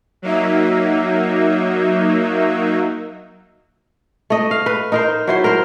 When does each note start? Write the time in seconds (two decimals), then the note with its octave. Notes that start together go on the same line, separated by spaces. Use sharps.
0.22 F#3 A#3 D#4 E5
4.30 A3 D#5
4.51 F5
4.66 B4
4.92 D#4 A#4 C5
5.27 F#3 E4 C5
5.44 A#4 C5